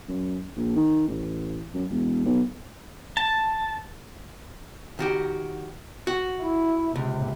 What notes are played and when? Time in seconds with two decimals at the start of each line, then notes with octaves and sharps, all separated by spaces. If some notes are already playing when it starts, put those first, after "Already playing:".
0.08 F#2
0.56 A#1
0.76 D#3
1.08 A1
1.74 F#2
1.90 E1
2.25 B1
3.17 A5
4.99 D#3 F#4 G4
6.07 F#4
6.40 E4
6.96 C#2 C3